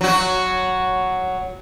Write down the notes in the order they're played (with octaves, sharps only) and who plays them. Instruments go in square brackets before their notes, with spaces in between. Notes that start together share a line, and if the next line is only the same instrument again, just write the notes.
[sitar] F#3 F#4